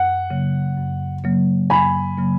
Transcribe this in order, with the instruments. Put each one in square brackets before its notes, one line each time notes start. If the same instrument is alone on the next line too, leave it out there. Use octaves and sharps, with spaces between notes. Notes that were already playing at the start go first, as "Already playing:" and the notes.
Already playing: [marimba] F#2 [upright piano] F#5
[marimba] C#3 F#3 A#3
F#2
C#3 F#3 A#3
[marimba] F#2 [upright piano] G#5 B5
[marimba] C#3 F#3 A#3